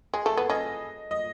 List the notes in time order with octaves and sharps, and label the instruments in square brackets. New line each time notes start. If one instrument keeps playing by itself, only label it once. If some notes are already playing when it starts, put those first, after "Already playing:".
[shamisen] G#3 [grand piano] G#4
[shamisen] A3 [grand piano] A4
[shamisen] B3 [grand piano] B4
[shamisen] C#4 [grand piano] D#5
[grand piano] D#5